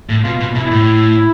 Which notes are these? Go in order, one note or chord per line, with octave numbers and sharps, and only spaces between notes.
A2
B2 F4
B2
B2 E4
A2